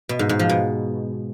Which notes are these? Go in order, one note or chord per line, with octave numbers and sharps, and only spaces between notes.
B2
G#2
G#2
F3
B2